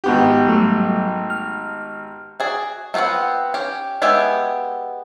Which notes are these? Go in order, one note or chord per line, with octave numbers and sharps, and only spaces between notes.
G#1 B3 G4
F#3 G3 A3
F6
F#4 G#4 D5
A3 B3 C4 F4 F#5
C#4 G4
G#3 B3 G4 E5 G#5